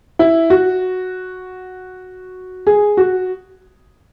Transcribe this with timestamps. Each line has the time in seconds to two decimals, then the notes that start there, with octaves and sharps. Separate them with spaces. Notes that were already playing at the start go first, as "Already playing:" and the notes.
0.19 E4
0.50 F#4
2.67 G#4
2.97 F#4